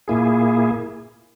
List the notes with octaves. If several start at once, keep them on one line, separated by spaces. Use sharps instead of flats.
A#2 A#3 E4 G#4